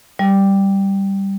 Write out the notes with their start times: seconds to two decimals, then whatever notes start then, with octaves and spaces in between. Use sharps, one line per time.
0.19 G3